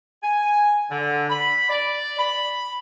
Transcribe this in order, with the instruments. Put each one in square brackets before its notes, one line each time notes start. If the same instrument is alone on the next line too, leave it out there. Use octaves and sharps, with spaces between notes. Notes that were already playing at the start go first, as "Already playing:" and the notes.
[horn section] G#5
D3
B5
D5
B5